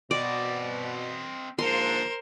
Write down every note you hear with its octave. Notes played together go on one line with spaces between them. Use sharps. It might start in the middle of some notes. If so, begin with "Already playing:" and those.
B2 C4 D5 D#5
G#2 D3 F3 A#3 A#4 C5 C6